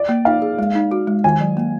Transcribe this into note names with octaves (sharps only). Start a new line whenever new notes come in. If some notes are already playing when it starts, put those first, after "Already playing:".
Already playing: D5
A#3
D#4 F5
G#4
G#3
D#4
F#4
G#3
D#3 G#5
F#3
A#3